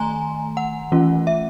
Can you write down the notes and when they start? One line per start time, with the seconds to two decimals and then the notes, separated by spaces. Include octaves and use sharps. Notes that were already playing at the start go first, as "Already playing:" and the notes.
Already playing: D#3 A3 G#5 A#5 C6
0.57 F#5
0.92 E3 A3 C#4 F4
1.27 E5